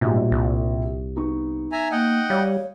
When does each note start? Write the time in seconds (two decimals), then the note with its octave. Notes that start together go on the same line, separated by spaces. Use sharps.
0.01 A#1 G#2 B2 G3
0.32 C2
1.16 B3 D#4 C#6
1.72 E5 G#5 A#5
1.91 A#3 D#5 F#5 G5
2.30 G3 C#5 F5